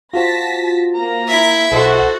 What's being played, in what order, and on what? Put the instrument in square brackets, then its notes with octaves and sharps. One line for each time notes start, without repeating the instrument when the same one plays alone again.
[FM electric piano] F4 F#4 C5 [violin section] A5 A#6 B6
[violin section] A#3 [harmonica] A#5
[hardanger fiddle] E4 E5
[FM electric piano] B1 D#5 [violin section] F#4 [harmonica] A4 C5